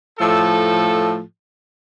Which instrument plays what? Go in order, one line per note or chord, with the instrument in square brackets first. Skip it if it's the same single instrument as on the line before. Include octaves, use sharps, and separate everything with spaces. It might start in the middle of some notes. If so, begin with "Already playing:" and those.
[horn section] A2 F3 A4